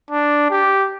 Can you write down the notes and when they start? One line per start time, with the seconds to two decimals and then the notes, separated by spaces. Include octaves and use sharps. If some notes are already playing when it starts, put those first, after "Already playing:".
0.11 D4
0.51 G4